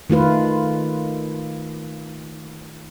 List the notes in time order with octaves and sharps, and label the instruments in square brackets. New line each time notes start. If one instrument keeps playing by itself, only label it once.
[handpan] D#3 A3 F4 B4